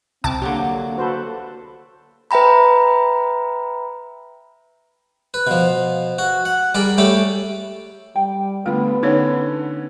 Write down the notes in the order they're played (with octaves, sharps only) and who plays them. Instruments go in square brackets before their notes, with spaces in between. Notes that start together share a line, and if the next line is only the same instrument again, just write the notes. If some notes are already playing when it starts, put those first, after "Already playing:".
[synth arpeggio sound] C2 A5 D6 [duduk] C4
[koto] D3 F#3 [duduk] A#3 [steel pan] G4
[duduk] F#4 [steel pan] A4 B4 C5
[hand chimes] B4 E5 G5 A#5 B5
[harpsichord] B4
B2 F3
F#4
F#5
G3 G#4 A#4 D5 B5
G3 A3 G4 C#5 B5 D6
[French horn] G3 [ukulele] G5
[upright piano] D3 [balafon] A3 [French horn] B3 [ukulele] F4 B5
[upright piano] D3 C#4 [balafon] D#4 B4 C#5